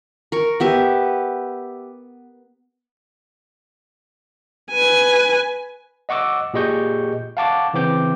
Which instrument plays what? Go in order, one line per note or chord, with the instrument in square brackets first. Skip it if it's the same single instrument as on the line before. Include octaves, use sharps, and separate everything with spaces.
[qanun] A#4 C#6
B3 G4 E5
[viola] B4 G#5
[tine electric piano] D#5 F#5 C#6 D6 E6
A#2 G4 G#4 D#5 C#6 G6
F5 F#5 A5 C#6 D6
C#3 E3 C4 D6 G6